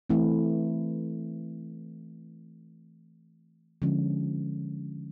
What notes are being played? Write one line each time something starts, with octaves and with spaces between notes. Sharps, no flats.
E3 A3 C4 E4
D3 F3 G#3 C#4